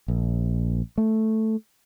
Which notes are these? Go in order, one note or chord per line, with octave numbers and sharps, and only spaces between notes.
A#1
A3